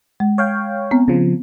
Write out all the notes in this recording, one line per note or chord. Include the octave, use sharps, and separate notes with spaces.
G#3
C#5 F5 G5
B3 C4
C#3 F3